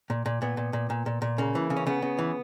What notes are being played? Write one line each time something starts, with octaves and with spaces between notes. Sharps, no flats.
A#2
A#2
A#2 B3
A#2
A#2
A#2
A#2
A#2
C#3 A#3
E3
C#3
C#4
C#3 B3
C#3
E3